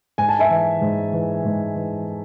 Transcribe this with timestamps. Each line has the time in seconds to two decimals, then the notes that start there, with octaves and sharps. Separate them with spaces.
0.18 G#2 G#5
0.29 A5
0.39 E5 G#5
0.50 E3
0.81 G#2
1.13 E3
1.45 G#2
1.75 E3